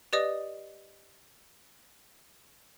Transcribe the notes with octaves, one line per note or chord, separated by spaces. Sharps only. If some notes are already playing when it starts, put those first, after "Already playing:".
G4 B4 D5 D#5 D#6